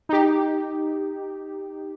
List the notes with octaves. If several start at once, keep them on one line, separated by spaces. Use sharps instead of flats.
D#4 G4